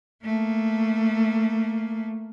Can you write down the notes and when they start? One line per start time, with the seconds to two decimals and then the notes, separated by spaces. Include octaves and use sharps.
0.25 A3 A#3